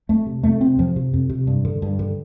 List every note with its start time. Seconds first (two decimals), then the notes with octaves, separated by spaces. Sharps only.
0.09 F2 A3
0.26 C3
0.43 F2 A3
0.61 C3 C4
0.79 F2 F3
0.96 C3
1.13 F2
1.29 C3
1.47 G2
1.65 D3
1.82 G2
1.99 D3